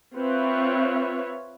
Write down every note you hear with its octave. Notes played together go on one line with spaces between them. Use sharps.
C4 F4 B4 C#5 E5